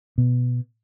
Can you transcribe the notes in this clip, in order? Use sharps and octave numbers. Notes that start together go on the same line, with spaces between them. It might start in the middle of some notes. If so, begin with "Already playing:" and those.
B2